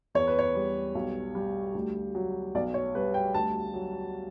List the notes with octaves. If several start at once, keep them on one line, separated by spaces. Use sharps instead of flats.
E2 C#5
B4
C#5
G3
B1
G3
D2
F#3
B1 D5
C#5
G3 B4
G5
D2 A5
F#3